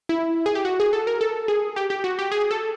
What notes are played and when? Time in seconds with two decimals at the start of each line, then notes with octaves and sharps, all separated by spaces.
0.09 E4
0.46 G#4
0.55 G4
0.65 F#4
0.80 G#4
0.93 A4
1.07 A#4
1.21 A4
1.48 G#4
1.76 G4
1.90 G4
2.04 F#4
2.19 G4
2.32 G#4
2.51 A4